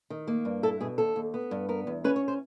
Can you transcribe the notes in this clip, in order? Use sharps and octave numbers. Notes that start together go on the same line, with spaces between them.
D#3
A#3
G2
E4 A4
B2 G#4
D#2 A4
D#2
B3
G2
B3 A#4
E2
C#4 B4
C#5
C5